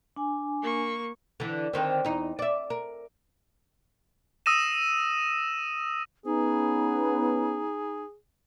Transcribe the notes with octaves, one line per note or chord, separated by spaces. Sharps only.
D4 G#5
A#3 C#6
D3 E3
D3 D#3 C4
E2 D#4
D5 E5
A#4
D#6 E6 A#6 D#7 E7
B3 C#4 D#4 G#4